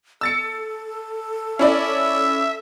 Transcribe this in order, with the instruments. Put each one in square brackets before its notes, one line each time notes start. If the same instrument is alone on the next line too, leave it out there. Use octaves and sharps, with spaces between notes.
[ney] A4 [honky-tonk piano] E6 A6 C#7
[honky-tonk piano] C#4 E4 D5 [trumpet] E5